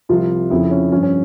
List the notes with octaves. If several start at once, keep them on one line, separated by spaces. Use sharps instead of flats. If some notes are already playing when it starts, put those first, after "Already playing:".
C2 C3 F3 F4
F2 C#3 F3 E4
C#4
G2 F3 C#4
C#4